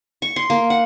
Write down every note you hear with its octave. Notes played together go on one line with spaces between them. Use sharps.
C#6
C6
A#3
F#5